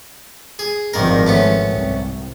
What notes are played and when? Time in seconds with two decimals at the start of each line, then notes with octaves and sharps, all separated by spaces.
0.59 G#4
0.93 G#1 G2 D#3 F3 A#4
1.27 A3 B3 C#4
1.69 C2